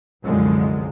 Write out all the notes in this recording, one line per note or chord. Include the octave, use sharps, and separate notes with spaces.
C2 F#2 D3 F3 G#3